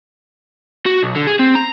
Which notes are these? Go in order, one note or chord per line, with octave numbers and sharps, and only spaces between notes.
F#4
B1
D3
G#4
C4
A#5